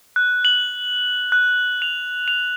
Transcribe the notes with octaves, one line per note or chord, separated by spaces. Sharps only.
F#6
F#7
F#6
F7
F7